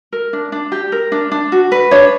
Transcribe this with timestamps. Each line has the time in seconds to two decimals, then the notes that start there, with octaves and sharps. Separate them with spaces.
0.12 A#4
0.33 D4
0.52 D4
0.72 G4
0.92 A#4
1.12 D4
1.32 D4
1.52 F#4
1.72 B4
1.91 D4 C#5